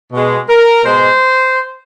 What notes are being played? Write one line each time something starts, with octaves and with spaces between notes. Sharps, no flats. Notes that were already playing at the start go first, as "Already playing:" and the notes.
B2 G#3
A#4
B2 G#3 C5